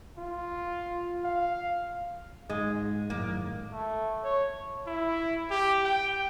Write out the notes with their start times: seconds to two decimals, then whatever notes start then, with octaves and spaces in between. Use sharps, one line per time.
0.18 F4
1.24 F5
2.50 G#2 G#3
3.10 G#1 F#2 A2 A#3
3.72 A3
4.24 C#5
4.87 E4
5.50 G4
5.84 G5